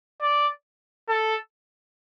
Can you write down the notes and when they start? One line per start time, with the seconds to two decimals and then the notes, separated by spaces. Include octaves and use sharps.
0.22 D5
1.09 A4